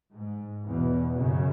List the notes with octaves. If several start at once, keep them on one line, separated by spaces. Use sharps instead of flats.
G#2
E2 B2
F#2 C#3